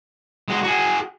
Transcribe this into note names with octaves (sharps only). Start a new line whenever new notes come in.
G#3 F#4
F#4 G#4